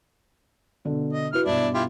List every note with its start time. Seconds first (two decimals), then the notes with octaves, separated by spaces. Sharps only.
0.85 B2 D3
1.13 D#5
1.33 E4 F#4 B4 F6
1.46 G2 B2 D4 E4 D5
1.74 E4 F4 G4